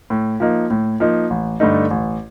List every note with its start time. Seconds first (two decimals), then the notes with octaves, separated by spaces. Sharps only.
0.10 A2
0.40 F3 A#3 D#4
0.70 A2
1.00 F3 A#3 D#4
1.30 A1
1.60 G2 D3 A3 D#4
1.91 A1